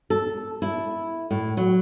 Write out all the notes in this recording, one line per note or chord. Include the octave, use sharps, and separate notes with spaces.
A4
E4
A2
F#3